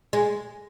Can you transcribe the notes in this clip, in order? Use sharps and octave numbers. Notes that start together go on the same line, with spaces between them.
G#3